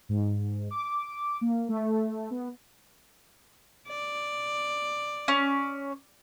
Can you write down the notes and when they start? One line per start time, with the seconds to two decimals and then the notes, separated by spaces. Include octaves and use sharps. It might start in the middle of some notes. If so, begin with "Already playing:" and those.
0.09 G#2
0.71 D6
1.41 A#3
1.69 A3
2.31 B3
3.88 D5
5.28 C#4